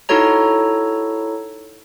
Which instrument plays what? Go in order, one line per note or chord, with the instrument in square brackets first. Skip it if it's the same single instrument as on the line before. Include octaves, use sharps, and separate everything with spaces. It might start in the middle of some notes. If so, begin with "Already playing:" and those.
[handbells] D#4 E4 F#4 A4 C#5 A#5